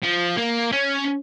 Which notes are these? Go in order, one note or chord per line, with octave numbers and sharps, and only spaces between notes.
F3
A#3
C#4